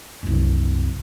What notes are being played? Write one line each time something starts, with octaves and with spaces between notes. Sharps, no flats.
C2 F#2